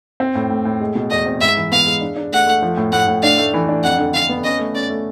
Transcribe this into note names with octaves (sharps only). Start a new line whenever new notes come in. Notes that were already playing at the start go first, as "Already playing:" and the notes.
C4
A2
A2
A2
G#3
B2
E2 D#5
C4
G#2 E5
E3
B3 F5
G#3
D4
D4
A3 F#5
A3
F3
A2
A2 F#5
A2
D4 F5
A3
E3
D4
F2 F#5
D3
D3 F5
B3
C#4 D#5
A3
C#4 D5
A3